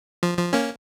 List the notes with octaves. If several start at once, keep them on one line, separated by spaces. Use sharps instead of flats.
F3
F3
A#3 C#4